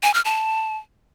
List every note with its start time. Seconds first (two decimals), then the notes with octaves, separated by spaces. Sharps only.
0.03 G#5
0.14 F6
0.25 A5